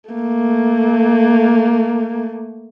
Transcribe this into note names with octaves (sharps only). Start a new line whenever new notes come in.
A3 A#3